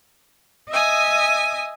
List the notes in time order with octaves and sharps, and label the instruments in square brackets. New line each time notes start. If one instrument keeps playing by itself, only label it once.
[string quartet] D#5 E5 G#5 D#6